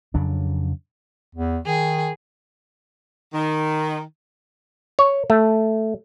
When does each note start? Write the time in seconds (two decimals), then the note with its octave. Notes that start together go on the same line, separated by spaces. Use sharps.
0.14 F2 C#3 F#3 D4
1.35 E2
1.66 D#3 G#4
3.34 D#3
4.99 C#5
5.30 A3